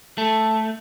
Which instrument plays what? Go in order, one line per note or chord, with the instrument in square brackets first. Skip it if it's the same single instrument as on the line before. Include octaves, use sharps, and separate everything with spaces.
[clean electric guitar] A3 [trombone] A4